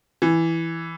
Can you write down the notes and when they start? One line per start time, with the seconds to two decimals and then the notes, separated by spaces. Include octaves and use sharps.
0.22 E3